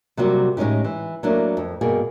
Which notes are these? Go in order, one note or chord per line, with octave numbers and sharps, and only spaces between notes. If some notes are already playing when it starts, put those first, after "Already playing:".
C3 F#3 G3 A#3 C4 F#4
A2 G#3 C#4 D#4 G4
E3
F#3 A3 A#3 D4 E4
F2
G2 B2 A#3 G#4